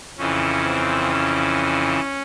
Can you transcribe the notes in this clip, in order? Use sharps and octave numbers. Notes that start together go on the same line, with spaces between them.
F2 C#3 E3 C#4
C4
C#4